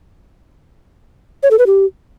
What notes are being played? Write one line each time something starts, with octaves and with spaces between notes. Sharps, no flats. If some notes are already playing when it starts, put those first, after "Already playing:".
C#5
A4
B4
G4